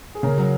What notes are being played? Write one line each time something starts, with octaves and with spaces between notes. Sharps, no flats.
G#4
C#3 A#4
F#3